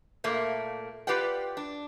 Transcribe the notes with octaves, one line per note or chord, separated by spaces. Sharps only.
A#2 A3 A#3
F4 G4 B4 D5 F#5 G5
D4